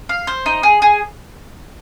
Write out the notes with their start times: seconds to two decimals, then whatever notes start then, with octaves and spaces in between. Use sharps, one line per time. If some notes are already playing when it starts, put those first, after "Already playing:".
0.09 F5
0.27 C5
0.46 D#4
0.63 G#4
0.82 G#4